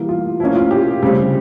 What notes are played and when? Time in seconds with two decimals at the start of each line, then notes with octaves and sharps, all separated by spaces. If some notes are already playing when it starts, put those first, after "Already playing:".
Already playing: E3 G3 A#3
0.09 F4
0.40 F3 A#3 C#4 E4
0.56 F4
0.71 G4
1.03 C#3 G3 C4